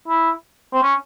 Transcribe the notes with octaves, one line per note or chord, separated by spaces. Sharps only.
E4
C4
C#4